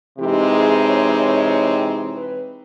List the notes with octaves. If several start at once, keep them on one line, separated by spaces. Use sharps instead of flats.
C3 E3 G#3 C4 D#4 G4
G#4
C#5
C#5
B4